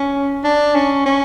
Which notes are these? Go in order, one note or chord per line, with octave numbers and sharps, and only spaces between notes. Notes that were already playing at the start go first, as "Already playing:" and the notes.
Already playing: C#4
D4
C#4
C#4